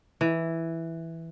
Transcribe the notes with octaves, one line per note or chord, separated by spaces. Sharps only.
E3